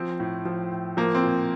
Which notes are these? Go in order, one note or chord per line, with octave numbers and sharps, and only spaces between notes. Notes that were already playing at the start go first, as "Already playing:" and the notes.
Already playing: F3 C4
A2
F3
A2
F3 A#3
C4
A#2